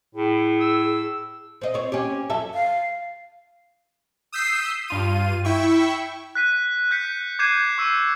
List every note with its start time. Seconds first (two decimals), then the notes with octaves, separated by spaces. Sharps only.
0.15 A2 G#4
0.61 E6
1.61 C4 D#5
1.74 C4 C#5
1.92 C#4 G4
2.30 F#2 A4 E5
2.54 F5
4.32 D#6 E6 G6 B6 C7
4.88 G2 F4 D#7
5.45 E4 E5 G5 C#6
6.35 F#6 B6 D#7
6.91 F#6 G6 B6 C#7
7.39 D6 G6 G#6 C7 D#7 E7
7.78 C#6 E6 C7 D#7